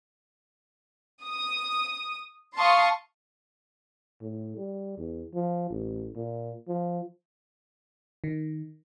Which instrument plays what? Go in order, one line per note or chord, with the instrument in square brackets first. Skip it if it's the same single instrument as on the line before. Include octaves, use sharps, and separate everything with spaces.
[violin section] D#6
F5 A5 C6 C#6 D#6
[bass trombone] A2
G3
E2
F3
A1
A#2
F3
[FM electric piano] D#3